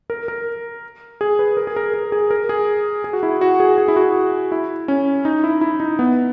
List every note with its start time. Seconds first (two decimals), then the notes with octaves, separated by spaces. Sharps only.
0.10 A#4
0.28 A#4
1.21 G#4
1.39 B4
1.57 A#4
1.67 G#4
1.76 A#4
1.94 A#4
2.12 G#4
2.31 A#4
2.49 G#4
3.04 G#4
3.13 F#4
3.23 E4
3.41 F#4
3.60 G#4
3.78 G#4
3.88 E4
3.96 F#4
4.52 E4
4.88 C#4
5.25 D#4
5.44 E4
5.61 E4
5.80 D#4
5.99 B3